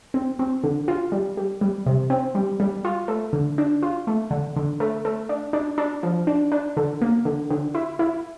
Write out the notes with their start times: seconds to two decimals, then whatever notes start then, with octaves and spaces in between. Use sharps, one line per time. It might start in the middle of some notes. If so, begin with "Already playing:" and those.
0.14 C4
0.39 C4
0.63 D3
0.88 F4
1.12 G3
1.37 G3
1.61 G3
1.86 C3
2.10 C4
2.35 G3
2.60 G3
2.85 F4
3.08 A3
3.33 D3
3.58 D4
3.83 F4
4.07 A3
4.31 D3
4.56 D3
4.80 A3
5.05 A3
5.29 D4
5.53 D4
5.78 D4
6.03 F3
6.27 D4
6.52 D4
6.77 D3
7.01 A#3
7.25 D3
7.50 D3
7.75 E4
7.99 E4